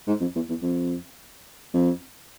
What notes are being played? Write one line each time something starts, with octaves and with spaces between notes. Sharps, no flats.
G#2
F2
E2
E2
F2
F2